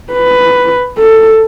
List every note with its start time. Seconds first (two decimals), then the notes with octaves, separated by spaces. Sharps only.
0.13 B4
0.98 A4